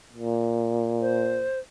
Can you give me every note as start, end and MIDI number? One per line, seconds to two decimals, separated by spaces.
0.12 1.49 46
1.01 1.59 72